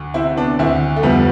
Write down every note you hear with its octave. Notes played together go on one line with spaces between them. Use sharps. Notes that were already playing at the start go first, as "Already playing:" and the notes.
Already playing: D2
C3 C4 E4
B3 D4
D2 C4 E4
A3
F2 G3 B3